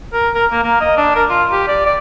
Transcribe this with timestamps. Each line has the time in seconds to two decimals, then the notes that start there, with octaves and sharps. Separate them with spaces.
0.13 A#4
0.35 A#4
0.52 A#3
0.63 A#3
0.81 D#5
0.97 D4
1.15 A#4
1.29 F4
1.52 G4
1.68 D5
1.86 D5